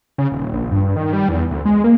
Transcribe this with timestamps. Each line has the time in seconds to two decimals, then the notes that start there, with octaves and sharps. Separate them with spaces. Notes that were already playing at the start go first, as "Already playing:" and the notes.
0.18 C#3
0.32 D#1
0.53 A#1
0.71 G2
0.96 D#3
1.13 G3
1.29 E2
1.51 D2
1.65 G#3
1.84 A#3